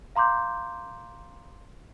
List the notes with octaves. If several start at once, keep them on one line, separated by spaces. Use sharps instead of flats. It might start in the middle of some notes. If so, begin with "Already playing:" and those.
F5 A#5 C6 D6 G6